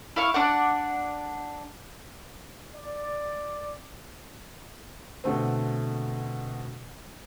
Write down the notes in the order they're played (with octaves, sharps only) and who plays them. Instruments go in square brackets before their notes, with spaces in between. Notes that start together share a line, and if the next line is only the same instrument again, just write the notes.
[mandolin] E4 F5 C#6
D4 D5 F#5
[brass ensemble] D5
[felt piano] B2 D3 A3 C4